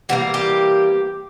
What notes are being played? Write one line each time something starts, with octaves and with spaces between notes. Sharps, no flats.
E3 G3 A#3 F#4
G4